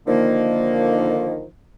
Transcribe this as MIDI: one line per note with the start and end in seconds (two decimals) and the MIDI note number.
0.07 1.45 50
0.07 1.45 51
0.07 1.45 53
0.07 1.45 58